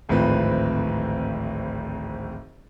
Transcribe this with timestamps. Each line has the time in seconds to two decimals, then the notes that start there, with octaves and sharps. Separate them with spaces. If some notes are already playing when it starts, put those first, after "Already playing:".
0.09 D1 G#1 A2 F3 C4 B4